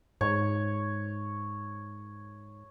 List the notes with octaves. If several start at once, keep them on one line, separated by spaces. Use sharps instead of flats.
G#2 C#5